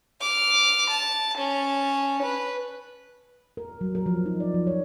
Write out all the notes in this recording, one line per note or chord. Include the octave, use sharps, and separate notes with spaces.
D6 F6
A5
C#4 A5
B4
A#4
F#3
A#4
F3
D#4
D5
F3
C#5